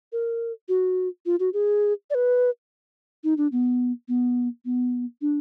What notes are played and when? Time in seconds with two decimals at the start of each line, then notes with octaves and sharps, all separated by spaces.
0.13 A#4
0.69 F#4
1.26 F4
1.40 F#4
1.54 G#4
2.10 D5
2.15 B4
3.24 D#4
3.38 D4
3.52 B3
4.08 B3
4.65 B3
5.22 D4